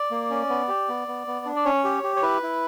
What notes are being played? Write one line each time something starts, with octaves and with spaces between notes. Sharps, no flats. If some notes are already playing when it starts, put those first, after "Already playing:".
Already playing: D5
A#3
C#4
B3
G4
B3
B3
B3
D4
D5
C#4 C#5
G4
G4
C#5
E4 B4
E4